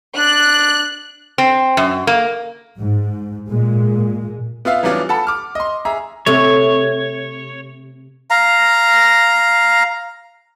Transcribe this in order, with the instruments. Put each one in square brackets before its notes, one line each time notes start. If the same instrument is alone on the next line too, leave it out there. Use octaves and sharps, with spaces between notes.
[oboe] D4 [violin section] F#6
[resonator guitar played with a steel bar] C4
F#2
A#3
[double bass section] G#2
A#2 G#3
[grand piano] B3 F4 E5 F5
E3 F#3 G3 B3 D4 F4
A4 F#5 A5 B5
D6 F6
D#5 C6
G#4 E5 A#5
[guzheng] C3 A3 [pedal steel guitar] C#5
[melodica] F5 A#5